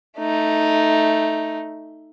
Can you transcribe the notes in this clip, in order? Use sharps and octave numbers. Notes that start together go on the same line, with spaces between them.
A3 D#4